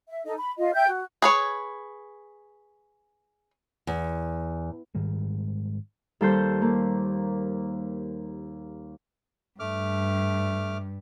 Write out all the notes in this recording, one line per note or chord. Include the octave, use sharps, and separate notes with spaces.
E5
D#4 A4 D#5
B5
F4 D#5
E5 G5 G6
F#4
G#4 B4 C#5
E2
G#2 D#3 G3 G#3
D#2 G3 A4 C5 C6 G6
A#3
G2 A3 D6 F6